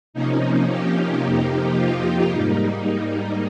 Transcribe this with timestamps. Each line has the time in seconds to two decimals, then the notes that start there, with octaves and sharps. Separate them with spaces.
0.14 C3 F3 A#3 C#4 D#4
0.67 D#4 G4
1.21 F2 C3 F3 A#3
1.75 F4
2.29 G#2 G3 A#3 D#4